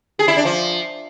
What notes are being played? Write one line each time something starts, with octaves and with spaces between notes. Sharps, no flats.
G#4
E4
D4
F3